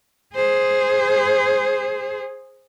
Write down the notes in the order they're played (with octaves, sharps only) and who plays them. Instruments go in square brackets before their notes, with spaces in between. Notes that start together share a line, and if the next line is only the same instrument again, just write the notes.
[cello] G#4 C5